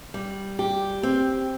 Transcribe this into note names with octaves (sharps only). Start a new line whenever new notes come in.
G3
G4
C4